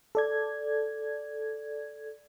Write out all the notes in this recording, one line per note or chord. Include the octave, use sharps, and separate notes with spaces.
A4 D5 G#6